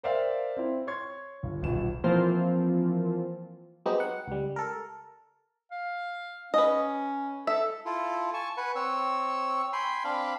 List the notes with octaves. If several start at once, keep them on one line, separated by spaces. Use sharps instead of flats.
A#4 C5 D5 E5 F5 G5
C4 E4
C#5 C6 C#6 G#6
G1
D#1 B1 E7
E3 F3 A#3 C4 F4
F#3 G#3 B3 C4 D#4 G4
F#5
C#2 G3
A4 A#4
F5
C#4 B4 D#5
A4 E5
E4 F4 A4
G#5 A5 C#6
B4 F#5 G#5
C4 C#5 E6
G5 G#5 B5 C6
C4 D4 F5 B5